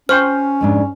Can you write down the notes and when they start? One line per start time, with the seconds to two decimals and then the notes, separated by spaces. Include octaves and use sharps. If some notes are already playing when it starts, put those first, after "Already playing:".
0.09 C#4 C5 G5 C#6 F6
0.61 F2 G#2 D4